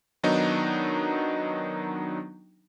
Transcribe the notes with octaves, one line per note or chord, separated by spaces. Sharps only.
D#3 F#3 B3 D4 D#4